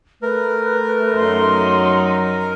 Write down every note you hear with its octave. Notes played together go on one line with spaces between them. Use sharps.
A3 A#4 B4
F#2 F#3 D#4 C6